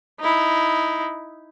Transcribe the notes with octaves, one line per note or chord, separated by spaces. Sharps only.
D#4 E4